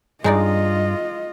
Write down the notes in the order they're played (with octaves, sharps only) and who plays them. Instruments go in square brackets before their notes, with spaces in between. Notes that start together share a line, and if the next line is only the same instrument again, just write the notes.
[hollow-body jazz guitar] G2 [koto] G#3 D#4 D5 [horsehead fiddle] F4 D#5